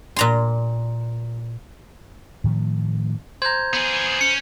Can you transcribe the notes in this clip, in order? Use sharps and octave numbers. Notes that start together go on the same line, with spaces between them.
A#2 A#5 C6
A2 D#3 F3 A3
C5 A#5 G6 G#6
B3 G#4
C#4 C#7